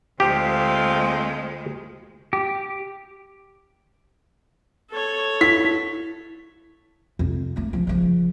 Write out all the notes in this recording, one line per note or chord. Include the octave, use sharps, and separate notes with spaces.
D2 G#3 A3 C4 F4 G4
G4
A4 C#5
E4 B6
F2 C3
A3 A#3
C#3 F3
C#3 F3